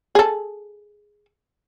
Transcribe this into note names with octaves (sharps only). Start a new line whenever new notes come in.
G#4 A4